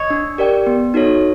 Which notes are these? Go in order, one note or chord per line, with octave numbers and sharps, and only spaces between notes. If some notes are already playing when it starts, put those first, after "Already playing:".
Already playing: C#5 D#5
D4
G4 A#4 D5 G5
B3
D#4 F#4 A4 C#5